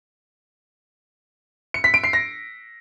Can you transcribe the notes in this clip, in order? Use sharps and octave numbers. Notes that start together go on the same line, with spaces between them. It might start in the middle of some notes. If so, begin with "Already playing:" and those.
C#7
B6
D7
C7
A#6